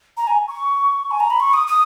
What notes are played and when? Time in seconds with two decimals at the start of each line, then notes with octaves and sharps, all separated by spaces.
0.17 A#5
0.27 G#5
0.48 C#6
1.11 G#5
1.20 A#5
1.30 B5
1.40 C#6
1.54 D#6
1.67 D#6